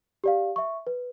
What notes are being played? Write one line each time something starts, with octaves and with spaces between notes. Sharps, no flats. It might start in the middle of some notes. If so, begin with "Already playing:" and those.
G4 D5 F5
E5 C#6
B4